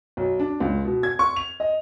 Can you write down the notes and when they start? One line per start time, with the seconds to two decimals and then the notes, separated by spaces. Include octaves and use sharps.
0.17 B1
0.40 D4
0.60 C#2
0.85 B2
1.03 G#6
1.19 C#6
1.36 F7
1.60 D#5